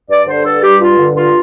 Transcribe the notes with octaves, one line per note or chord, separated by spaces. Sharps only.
G2 D5
D3 C5
G2 A4
G3 G4
G2 F4
D3
G2 F4